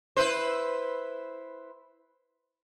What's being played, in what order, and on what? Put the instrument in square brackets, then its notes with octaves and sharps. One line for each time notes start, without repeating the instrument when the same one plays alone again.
[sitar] E4 B4 C5